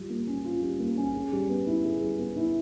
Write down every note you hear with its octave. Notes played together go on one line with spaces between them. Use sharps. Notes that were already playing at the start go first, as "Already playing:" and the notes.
Already playing: G3 F4
A#3
C#4
F4
G3
A#3
C#4
G#4
G3
B3
E4
G#4
G3
B3
E4